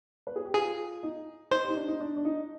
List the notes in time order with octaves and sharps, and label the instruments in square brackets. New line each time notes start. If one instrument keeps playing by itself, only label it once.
[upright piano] B4
G#4
G4
[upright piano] F4 [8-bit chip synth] G#4
[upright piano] D#4
[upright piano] D#4 [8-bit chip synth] C5
[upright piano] G4
D#4
D4
D#4
D4
D4
D#4